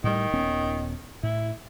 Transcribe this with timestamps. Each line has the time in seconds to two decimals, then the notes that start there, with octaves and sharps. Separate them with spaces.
0.04 A2 D#3 G3
0.33 D#1 B3 C#4
1.23 A2 E4